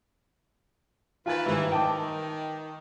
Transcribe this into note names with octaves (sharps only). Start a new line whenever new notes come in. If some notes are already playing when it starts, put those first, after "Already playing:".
D#3 E3 F4 B4 G#5 A6
G#2 D#3 E3 G3
D#3 G5 A5 D6